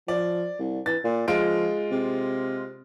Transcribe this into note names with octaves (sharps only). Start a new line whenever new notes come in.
F3 D5
C2
E3 A6
A#2
F3 G#3 F4 D7
C3